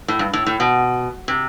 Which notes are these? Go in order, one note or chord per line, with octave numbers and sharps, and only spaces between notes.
A2
G2
A2
A2
B2
C3